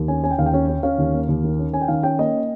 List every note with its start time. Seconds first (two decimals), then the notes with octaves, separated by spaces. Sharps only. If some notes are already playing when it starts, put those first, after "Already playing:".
Already playing: D#2
0.08 C#4 G#5
0.23 C#4 G#5
0.31 G5
0.38 D#2 F5
0.46 G5
0.54 C#4
0.68 C#4
0.83 C#4 F5
0.98 D#2
1.13 A#3
1.29 D#2
1.44 D#3
1.59 C#4
1.73 C#4 G#5
1.81 G5
1.88 D#3 F5
2.03 C#4 G5
2.19 A#3 D#5